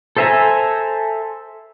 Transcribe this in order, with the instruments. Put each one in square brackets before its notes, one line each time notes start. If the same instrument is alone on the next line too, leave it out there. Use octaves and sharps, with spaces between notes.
[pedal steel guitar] A4 C5 E5 G#5 A#5